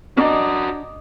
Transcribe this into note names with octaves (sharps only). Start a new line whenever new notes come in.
C#4 D4 F#4 A#4 D#5 D6